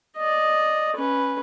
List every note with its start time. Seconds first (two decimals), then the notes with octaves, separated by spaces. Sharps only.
0.17 D5 D#5
0.96 C#4 B4